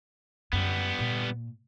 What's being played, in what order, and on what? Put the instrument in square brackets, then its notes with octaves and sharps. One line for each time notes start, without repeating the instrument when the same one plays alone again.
[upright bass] F#2 [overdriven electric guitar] G3 B3
[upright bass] A#2